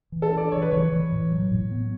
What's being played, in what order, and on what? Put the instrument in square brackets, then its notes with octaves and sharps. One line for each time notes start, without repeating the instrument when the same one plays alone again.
[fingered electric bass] E3
[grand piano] A4
[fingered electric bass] D4
[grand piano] D5
[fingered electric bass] E3 [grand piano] C#5
[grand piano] B4
[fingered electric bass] E3 [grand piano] C#5
[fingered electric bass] E3
A2
F#3
A2
B3